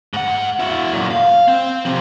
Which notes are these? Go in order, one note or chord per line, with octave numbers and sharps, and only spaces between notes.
G#2 F#5
E4 F#4
F#2 A#2
F5
C4
C3 F3